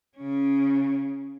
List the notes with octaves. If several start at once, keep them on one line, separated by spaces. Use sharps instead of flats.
C#3 C#4